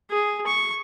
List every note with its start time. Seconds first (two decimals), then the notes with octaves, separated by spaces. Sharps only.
0.10 G#4
0.46 C#6